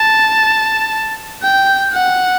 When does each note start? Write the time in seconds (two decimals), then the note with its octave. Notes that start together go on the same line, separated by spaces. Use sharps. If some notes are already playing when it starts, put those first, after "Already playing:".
Already playing: A5
1.42 G5
1.93 F#5